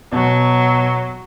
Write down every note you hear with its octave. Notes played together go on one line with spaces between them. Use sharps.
B2 F#3